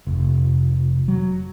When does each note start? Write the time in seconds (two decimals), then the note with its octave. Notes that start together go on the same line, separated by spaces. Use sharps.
0.07 F1
1.08 F#3